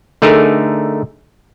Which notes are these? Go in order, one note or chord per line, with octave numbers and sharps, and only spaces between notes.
D3 A3 D#4 G#4 A#4